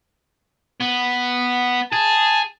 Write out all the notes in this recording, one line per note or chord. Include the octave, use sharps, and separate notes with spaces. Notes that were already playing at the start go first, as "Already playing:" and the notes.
B3
G#4 A5